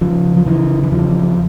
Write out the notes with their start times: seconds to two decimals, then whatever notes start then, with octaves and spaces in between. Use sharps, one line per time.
0.01 C#3 F3
0.36 F3
0.46 C#3 E3
0.83 E3
0.92 E2 F3